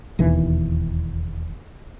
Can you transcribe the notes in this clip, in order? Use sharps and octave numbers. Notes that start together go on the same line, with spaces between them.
E1 D#2 E3